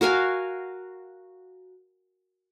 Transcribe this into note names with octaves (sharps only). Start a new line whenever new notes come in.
F#4 A#4 F5 G#5